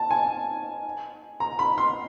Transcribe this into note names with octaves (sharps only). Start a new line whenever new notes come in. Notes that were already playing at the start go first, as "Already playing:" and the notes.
Already playing: A5
G#5
A#5
B5
C6